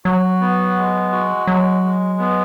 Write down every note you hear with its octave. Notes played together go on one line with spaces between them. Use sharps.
F#3 F#4
B3
G#3
F#4
F#3 G#3
G#3
B3